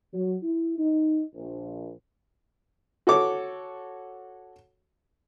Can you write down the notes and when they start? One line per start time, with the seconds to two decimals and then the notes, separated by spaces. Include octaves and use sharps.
0.14 F#3
0.42 E4
0.79 D#4
1.35 A#1
3.07 F#4 A4 C#5 D6